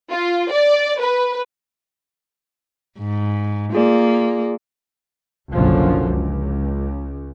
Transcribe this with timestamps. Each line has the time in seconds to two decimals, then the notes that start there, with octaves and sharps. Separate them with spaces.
0.11 F4
0.51 D5
1.00 B4
2.99 G#2
3.73 A#3 F4 G#4 D5
5.51 F#1 B1 F#2 D3 F3
6.05 C#2